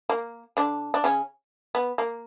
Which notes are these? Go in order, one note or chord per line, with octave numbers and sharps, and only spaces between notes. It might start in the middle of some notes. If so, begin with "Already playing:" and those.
A#3
D3 D4
D4
C#3 C#4
B3
A#3